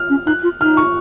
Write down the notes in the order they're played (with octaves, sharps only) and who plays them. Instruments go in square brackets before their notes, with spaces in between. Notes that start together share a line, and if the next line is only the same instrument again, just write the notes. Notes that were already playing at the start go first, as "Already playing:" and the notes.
Already playing: [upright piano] F6
[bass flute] C#4
[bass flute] D#4 [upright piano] F#6
[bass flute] F4
[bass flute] D#4 [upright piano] F6
[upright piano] C#6